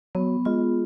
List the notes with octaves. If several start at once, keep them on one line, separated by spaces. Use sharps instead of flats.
F#3 B3
G#3 F4